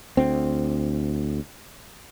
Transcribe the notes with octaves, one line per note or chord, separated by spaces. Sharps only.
D2 C4